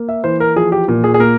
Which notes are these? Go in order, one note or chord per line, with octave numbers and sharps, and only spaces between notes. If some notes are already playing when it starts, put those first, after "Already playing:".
Already playing: A#3
E5
E3 C5
A#4
F3 G#4
G4
A#2
G#4
G#4
A#3 A#4